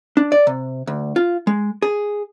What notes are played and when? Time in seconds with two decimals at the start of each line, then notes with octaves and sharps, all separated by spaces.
0.17 D4
0.32 D5
0.47 C3
0.87 D2
1.16 F4
1.47 G#3
1.82 G#4